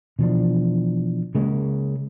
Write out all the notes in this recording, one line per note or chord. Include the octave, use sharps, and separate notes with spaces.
B2 E3 F3 D4
C#3 G#3 A#3 C#4